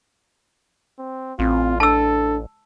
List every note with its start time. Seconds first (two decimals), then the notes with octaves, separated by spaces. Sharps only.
0.99 C4
1.39 A1 C4 F4
1.80 D4 A4 A5 E6